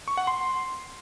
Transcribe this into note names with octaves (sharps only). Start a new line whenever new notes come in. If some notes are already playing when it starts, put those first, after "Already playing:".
C#6
F#5
C6